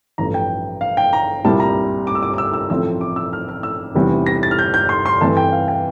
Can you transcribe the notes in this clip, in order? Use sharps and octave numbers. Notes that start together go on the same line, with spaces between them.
A1 G2 F3 A3 A#5
G5
F5
G5
A#5
C2 A#2 G3 C4 A5
A#5
D6
E6
D6
D6
E6
E6
A1 A2 F3 A3 C4 E6
D6
E6
F6
F6
E6
F1 E2 E3 G3 C4
A#6
A6
F6
G6
G6
C6
C6
G2 E3 A3 C4 A5
G5
F5
G5